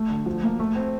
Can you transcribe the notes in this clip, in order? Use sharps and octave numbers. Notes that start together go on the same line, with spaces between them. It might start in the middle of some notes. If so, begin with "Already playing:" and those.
Already playing: A3
D3
F3
A#3
A3
C4